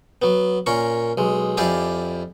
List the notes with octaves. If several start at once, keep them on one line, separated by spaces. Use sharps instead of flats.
F#3 B3
A#2 C#4 A#4 C#6
B1 G#3
F2 E4 G4 D5 F5 G#5